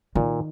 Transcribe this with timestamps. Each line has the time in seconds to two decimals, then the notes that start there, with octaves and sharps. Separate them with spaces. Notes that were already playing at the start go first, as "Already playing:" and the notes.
0.15 A#2 D#3